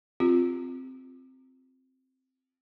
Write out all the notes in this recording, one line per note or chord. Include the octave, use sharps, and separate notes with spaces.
C4 F4 G4